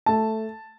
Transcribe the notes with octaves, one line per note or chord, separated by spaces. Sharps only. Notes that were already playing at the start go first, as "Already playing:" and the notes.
A3 A5